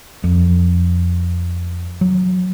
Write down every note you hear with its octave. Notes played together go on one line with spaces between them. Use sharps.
F2
F#3